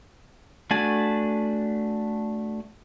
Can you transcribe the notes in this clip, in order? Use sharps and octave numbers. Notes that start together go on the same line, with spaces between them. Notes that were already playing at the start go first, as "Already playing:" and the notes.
A3 D4 F#4 G#5 A5